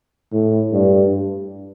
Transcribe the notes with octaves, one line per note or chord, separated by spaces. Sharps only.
A2
G2